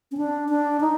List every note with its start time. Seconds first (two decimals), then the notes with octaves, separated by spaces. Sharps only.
0.12 C#4
0.17 D4
0.49 D4
0.81 D#4